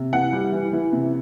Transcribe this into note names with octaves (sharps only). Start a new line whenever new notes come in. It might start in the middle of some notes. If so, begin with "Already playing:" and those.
Already playing: C3
E3 F#5
G3
E3
E3
C3